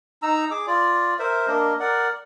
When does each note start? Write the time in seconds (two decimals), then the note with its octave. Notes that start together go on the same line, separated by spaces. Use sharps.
0.22 D#4 A#5 E6
0.51 G#4 D6
0.67 F4 D5
1.19 A#4 C5 E5
1.48 A#3 D4 A#4 D#5
1.80 A#4 D5 F#5